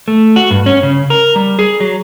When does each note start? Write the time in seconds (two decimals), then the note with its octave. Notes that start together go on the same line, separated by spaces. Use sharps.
0.08 A3
0.36 F#4
0.51 G2
0.66 C#4
0.83 C#3
1.10 A#4
1.36 G3
1.59 G#4
1.80 F#3